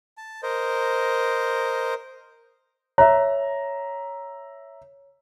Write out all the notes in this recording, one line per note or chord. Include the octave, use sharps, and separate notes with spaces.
A5
A#4 C5 D#5
C#5 E5 A#5